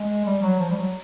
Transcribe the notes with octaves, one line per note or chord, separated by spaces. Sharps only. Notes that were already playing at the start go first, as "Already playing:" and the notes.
Already playing: G#3
G3
F#3
F3
G3
F#3